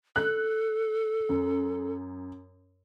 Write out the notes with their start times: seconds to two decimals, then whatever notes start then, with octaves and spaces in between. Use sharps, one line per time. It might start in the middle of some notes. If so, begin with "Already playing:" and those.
0.16 A4 F#6
1.29 F#2